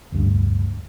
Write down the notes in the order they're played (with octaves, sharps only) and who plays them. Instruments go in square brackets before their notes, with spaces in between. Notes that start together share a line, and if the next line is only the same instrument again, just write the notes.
[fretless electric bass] F1 D2 G2